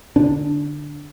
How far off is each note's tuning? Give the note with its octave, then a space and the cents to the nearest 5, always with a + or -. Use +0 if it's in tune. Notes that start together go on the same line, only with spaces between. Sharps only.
D3 +0 D4 -10